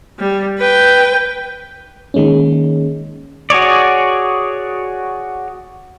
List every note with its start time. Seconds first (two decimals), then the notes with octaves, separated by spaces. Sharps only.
0.19 G3
0.58 B4 G5
2.14 D#3 G#3 A#3 C#4
3.50 F#4 G#4 C#5 D5